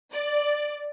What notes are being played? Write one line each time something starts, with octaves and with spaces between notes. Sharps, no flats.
D5